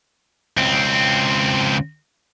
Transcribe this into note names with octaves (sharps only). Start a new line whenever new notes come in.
C#2 C4